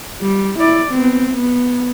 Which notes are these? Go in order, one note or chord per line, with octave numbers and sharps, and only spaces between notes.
G3
E4 D5
B3 C4
B3